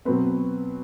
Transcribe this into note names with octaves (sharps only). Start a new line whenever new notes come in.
B2 F#3 C4 B4